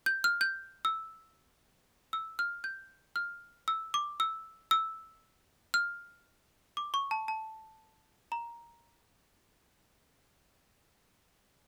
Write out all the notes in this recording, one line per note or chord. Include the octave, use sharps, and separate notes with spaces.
G6
F6
G6
E6
E6
F6
G6
F6
E6
D6
E6
E6
F6
D6
C#6
A5
A5
A#5